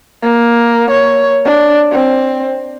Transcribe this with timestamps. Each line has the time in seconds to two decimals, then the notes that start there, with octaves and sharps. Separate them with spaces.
0.22 A#3
0.91 C#5
1.45 D4
1.92 C4